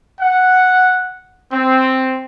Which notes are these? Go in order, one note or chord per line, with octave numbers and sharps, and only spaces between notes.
F#5
C4